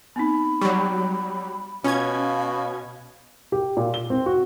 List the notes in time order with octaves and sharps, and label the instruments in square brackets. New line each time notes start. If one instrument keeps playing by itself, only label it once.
[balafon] B3 C4 D#4 [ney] B5
[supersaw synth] F#3 G3 [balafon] C#6
[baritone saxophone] B2 [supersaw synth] C#4 G#6 [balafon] F4 [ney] F5
[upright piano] G4
A#2
G7
C4
F#4